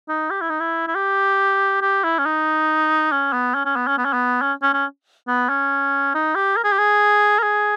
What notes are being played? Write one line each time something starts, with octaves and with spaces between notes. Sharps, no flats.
D#4
G4
E4
D#4
E4
E4
G4
G4
E4
C#4
D#4
C#4
B3
C#4
C#4
B3
C#4
B3
C#4
B3
C#4
C#4
C#4
B3
C#4
D#4
G4
A#4
G#4
G4
G#4
A#4
G#4